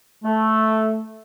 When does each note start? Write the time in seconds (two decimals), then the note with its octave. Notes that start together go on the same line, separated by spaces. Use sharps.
0.24 A3